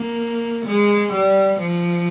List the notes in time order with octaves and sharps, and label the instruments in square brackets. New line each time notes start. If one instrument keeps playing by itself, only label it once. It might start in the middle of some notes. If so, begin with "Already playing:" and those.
Already playing: [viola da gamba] A#3
G#3
G3
F3